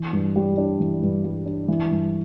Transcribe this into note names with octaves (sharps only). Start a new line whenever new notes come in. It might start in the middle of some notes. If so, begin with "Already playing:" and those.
Already playing: E3
G2
G3
D4
E3
G2
G3
D4
E3
G2